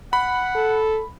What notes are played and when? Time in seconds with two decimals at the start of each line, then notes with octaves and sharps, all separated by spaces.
0.13 F#5 B5
0.55 A4